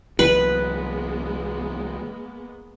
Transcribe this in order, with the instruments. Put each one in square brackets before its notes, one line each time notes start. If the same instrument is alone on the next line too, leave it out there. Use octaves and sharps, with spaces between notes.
[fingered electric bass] C2 E3 F#3 [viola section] G#3 A#3 B3 [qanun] B4